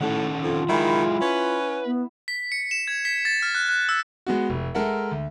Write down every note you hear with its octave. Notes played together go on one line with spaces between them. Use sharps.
A2 D#3 C#4 A4 F#5
F2 F4
D#3 F#3 G#3 E4 G#4 B5
C#4 B4
B3
B6
C#7
E7
G#6
B6
A6
F6
F#6
F#6
E6
G#3 B3 F#4
F1
G#3 A4 A#4 E5 F#5
D2